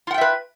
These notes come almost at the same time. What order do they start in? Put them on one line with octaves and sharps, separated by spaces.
F4 F#5 G5 E5 B4